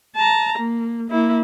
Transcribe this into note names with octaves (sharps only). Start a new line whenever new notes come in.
A5 A#5
A#3
A#3 E4